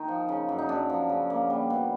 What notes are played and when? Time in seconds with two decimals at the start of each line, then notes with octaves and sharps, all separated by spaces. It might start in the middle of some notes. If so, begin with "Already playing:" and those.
Already playing: D#3 D#4
0.08 F3
0.29 C#3
0.49 F#2
0.58 D#4
0.69 F#2 D4
0.90 F3
1.09 C#3
1.30 A#3
1.50 G3
1.70 B2